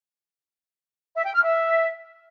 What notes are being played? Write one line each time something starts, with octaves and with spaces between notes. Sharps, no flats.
E5
G5
F6
E5